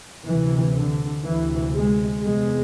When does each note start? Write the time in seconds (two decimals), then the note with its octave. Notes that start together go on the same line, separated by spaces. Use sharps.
0.26 D2 C3 E3
0.75 D3
1.25 D2 C3 E3
1.73 G#3
2.23 E2 C3 G#3